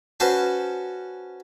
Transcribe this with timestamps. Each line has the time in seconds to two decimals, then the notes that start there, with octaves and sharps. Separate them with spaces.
0.20 C#4 F#4 B4 C5 A5